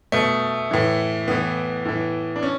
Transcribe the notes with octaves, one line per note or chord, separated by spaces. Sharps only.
B2 A3
A2 E3
A2 E3 B3
A2 E3
D4
C#4